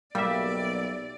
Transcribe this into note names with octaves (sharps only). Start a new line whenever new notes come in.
B1 G3 A#3 D5 E5